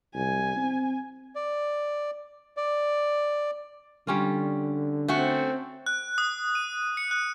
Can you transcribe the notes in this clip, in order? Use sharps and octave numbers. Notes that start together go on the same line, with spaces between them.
C2 G#5
C4
D5
D5
D3 G3 C#4 F4
A3 C4 C#4 F#4
F#6
D#6
D#7
C#7
F#6